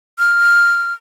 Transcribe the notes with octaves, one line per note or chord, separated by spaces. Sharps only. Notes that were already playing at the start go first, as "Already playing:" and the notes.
F6